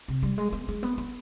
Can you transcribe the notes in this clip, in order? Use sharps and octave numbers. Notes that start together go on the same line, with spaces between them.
C3
G3
G#3
B3
G#3
B3
B3